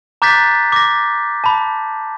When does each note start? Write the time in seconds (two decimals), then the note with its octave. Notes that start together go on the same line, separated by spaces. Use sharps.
0.22 A#5 D6 F#6 G6 A6 B6
0.72 D6 A#6
1.44 A5 B5